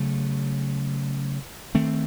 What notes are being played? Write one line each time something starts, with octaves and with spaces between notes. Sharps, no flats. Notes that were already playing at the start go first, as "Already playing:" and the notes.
Already playing: C#3 F#3 A3
D#3 A3 C4